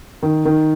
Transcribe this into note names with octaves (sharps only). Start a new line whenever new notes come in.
D#3
D#3